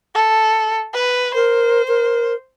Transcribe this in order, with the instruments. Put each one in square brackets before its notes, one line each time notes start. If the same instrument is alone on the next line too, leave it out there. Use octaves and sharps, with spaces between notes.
[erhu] A4
B4
[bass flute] A#4 [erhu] C5
[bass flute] A#4